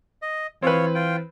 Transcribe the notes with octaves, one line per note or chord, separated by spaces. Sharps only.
D#5
E3 C4 F4 B4 C#5
F4 G5